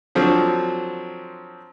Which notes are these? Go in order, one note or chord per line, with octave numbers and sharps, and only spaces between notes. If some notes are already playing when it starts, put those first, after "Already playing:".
D3 F3 F#3 C4